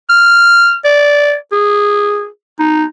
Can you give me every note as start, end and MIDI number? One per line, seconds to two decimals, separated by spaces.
0.09 0.76 89
0.85 1.35 74
1.52 2.28 68
2.60 2.84 63